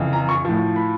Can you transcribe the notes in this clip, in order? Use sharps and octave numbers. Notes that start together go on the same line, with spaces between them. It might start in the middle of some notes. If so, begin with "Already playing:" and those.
Already playing: F2 C#3 E3
A#5
C#6
A2 F3
B5